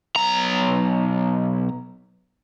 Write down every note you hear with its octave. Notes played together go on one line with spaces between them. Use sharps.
B1 A#5